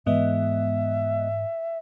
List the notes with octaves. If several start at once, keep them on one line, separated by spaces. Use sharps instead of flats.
G#2 E3 G#3 B3 D#5 E5